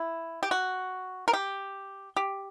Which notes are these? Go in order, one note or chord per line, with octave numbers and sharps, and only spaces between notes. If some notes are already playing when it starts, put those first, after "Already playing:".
Already playing: E4
G4
F#4
A#4
G4
G4